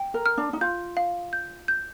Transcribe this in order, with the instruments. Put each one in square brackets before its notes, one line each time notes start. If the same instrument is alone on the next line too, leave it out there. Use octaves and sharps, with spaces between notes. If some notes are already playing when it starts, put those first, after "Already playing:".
Already playing: [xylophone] G5
[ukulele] A#4
[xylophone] F6
[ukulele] D4
D#4
[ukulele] F4 [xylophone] G6
[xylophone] F5
G6
G6